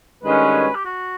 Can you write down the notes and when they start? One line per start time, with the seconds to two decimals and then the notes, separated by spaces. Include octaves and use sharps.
0.23 G2 D#3 G#3 C#4 F#4 B4
0.75 G4
0.85 F#4